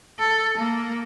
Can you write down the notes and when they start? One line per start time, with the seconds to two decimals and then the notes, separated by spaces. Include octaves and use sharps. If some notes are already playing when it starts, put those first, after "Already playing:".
0.20 A4
0.58 A#3